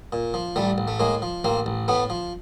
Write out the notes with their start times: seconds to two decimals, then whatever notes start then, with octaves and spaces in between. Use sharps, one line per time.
0.12 A#2
0.34 F3
0.56 A1 G3 A3
0.78 A1
0.88 A3
0.99 A2 G#3 A#3
1.22 F3
1.44 A1 A#3 C4
1.66 A1
1.88 A2 A3 B3
2.10 F3